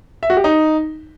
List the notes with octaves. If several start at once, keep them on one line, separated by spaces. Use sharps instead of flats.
E5
F#4
G4
D#4